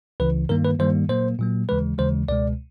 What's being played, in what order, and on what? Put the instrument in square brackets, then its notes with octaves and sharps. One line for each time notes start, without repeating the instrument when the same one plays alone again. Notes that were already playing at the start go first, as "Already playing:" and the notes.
[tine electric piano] C#2 C#3 E3 B4
G2 D#3 G3 A#3 A#4
B4
G2 D#3 G3 A#3 C5
A#2 F#3 A#3 C5
A#2 F#3 A#3
D#2 C#3 E3 G#3 B4
D#2 C#3 E3 G#3 C5
C#2 B2 G#3 D5